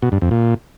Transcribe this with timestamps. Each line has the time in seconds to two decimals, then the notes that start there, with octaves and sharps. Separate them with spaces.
0.02 B2
0.12 G2
0.22 F2
0.31 A#2